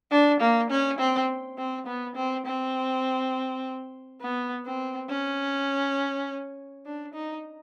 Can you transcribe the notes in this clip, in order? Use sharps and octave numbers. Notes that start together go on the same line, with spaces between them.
D4
A#3
C#4
C4
C4
B3
C4
C4
B3
C4
C#4
D4
D#4